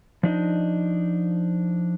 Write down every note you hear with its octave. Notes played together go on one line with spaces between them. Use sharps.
F3 D4 D#4 D#5